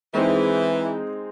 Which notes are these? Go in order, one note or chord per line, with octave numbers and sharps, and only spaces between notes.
E3 G#3 C4 D#4 G#4